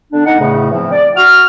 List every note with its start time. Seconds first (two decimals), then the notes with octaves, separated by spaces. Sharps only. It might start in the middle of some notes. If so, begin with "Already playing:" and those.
0.13 D3 B3 D4
0.26 D#4 F#5
0.39 E2 A2 C#3 A3
0.72 E3 F3 C4
0.92 D5
1.16 F#4 F6